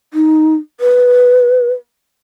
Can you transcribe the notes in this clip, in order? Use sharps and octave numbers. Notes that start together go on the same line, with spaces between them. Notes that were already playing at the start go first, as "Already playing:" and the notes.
D#4
B4